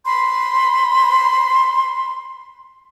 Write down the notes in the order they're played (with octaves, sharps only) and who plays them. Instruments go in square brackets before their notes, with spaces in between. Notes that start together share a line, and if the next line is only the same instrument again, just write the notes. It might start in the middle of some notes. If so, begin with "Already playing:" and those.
[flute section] B5 C6